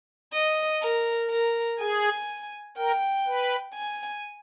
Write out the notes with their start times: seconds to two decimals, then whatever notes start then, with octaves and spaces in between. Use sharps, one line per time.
0.33 D#5
0.82 A#4
1.30 A#4
1.79 G#4 G#5
2.77 A#4 G5
3.27 B4
3.75 G#5